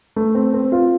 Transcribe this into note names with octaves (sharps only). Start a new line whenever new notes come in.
A3
C4
C4
F4